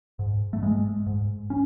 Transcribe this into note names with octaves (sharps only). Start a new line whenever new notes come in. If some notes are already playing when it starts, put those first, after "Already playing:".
G#2
A3
G#2 G#3
G#2
C#4